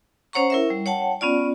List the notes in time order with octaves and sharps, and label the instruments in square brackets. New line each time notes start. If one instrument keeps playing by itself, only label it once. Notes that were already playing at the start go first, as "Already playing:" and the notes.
[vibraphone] C#4 C5 C#5 F#5 A#5 C#6
E4 A#4 E5
G3
C#5 F#5 G5 A5
B3 C#4 F4 D5